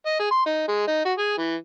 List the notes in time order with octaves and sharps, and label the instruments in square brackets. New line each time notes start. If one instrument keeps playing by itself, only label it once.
[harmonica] D#5
G#4
C6
D#4
G#3
D#4
F#4
G#4
E3